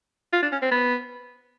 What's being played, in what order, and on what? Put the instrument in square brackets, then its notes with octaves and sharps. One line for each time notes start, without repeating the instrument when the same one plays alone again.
[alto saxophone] F4
D4
C#4
C4
B3